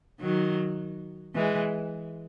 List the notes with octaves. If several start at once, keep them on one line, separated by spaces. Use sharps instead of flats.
D#3 F#3
E3 G#3